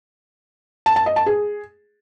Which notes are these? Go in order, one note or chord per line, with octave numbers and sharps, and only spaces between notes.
A5
A5
D#5
A5
G#4